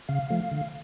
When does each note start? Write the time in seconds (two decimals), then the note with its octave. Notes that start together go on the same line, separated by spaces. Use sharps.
0.09 C#3 F5
0.30 F3 A3
0.51 D3